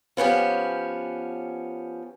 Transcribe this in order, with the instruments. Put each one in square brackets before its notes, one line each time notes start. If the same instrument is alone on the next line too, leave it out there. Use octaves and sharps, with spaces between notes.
[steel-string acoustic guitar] F3 B3 C#4 G4